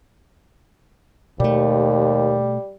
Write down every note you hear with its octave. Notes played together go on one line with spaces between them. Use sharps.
D#2 B2 G3 A3